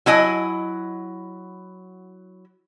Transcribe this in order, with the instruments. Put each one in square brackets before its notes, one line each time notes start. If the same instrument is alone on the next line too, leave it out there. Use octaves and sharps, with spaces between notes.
[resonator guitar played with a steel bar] F#3 E4 D#5 G#5